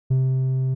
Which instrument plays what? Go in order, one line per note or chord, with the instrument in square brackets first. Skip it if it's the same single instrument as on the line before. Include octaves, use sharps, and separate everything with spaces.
[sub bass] C3